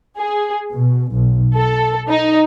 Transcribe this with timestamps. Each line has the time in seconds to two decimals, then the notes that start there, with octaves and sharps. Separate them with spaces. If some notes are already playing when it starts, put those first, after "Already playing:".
0.18 G#4
0.71 B2
1.13 B1
1.54 A4
2.08 D#4